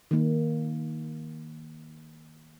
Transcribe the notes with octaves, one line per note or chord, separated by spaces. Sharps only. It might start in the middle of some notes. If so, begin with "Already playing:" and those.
D#3 A#3